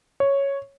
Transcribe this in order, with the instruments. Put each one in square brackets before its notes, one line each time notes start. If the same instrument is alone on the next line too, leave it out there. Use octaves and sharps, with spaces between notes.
[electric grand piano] C#5